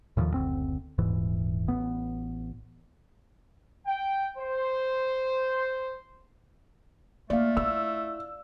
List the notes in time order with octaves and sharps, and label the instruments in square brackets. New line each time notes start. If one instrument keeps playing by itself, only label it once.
[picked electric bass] D#2 A2 D#3 F3
F#1 D2 C4
D#1 G#2 E3
A1 B3
[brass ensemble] G5
C5
[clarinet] A3 [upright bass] A#3 [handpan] D5 F5
[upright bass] E4 [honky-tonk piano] E6